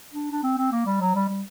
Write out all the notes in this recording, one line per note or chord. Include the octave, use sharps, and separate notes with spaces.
D4
D4
C4
C4
A#3
G3
F#3
G3
G3